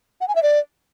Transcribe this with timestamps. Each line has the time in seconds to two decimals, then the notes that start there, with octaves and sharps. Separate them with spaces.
0.21 F#5
0.28 G#5
0.35 E5
0.43 D5